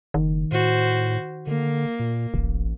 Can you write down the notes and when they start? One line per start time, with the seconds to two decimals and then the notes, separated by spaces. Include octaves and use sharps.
0.14 F#1 D#3
0.52 A2 F#4 C5
1.47 D3 A#3
1.99 A#2
2.34 D1 A1